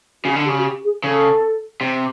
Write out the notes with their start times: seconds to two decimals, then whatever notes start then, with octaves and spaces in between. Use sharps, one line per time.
0.24 C#3 F#4
0.36 D3
0.45 G4
0.48 C#3
0.58 F#4
0.64 G4
0.83 G#4
1.03 C#3 A4
1.81 C3